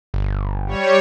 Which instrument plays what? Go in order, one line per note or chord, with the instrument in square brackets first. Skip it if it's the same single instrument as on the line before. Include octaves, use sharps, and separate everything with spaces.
[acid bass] G1
[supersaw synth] G3 C#5